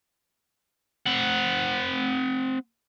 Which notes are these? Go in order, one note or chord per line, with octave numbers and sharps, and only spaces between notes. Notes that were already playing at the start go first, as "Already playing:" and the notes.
C4 F#5